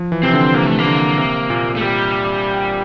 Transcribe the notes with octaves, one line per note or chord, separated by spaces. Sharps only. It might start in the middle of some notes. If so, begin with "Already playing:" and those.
Already playing: F3
E3
C3 C4
D3
C3 A#3
A3
A#3
D3
C3
A#2
A3
G3